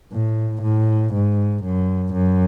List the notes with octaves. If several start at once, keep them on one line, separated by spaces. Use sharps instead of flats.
A2
A2
G#2
F#2
F#2